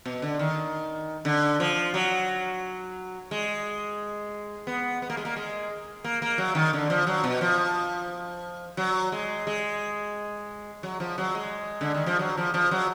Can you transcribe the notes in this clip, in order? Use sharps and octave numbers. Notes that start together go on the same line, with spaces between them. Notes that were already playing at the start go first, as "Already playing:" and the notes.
B2
D3
D#3
D3
F3
F#3
G#3
B3
B3
A#3
G#3
A#3
G#3
A#3
A#3
F#3
D#3
D3
F3
F#3
B2
F3
F#3
G#3
G#3
F#3
F3
F#3
G#3
D3
D#3
F3
F#3
F3
F3
F#3